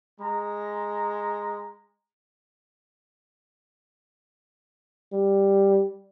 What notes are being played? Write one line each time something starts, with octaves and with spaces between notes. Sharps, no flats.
G#3 A#5
G3